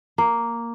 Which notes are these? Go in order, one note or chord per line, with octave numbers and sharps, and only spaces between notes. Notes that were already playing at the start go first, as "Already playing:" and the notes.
A#3